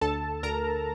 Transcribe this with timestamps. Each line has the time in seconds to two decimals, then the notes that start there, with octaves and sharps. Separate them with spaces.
0.01 D2 A4 A5
0.43 D2 A#4 A#5